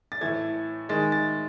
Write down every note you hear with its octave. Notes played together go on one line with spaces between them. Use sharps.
A6
A2 E3 A3 G#6
D#3 G#3 A6
A6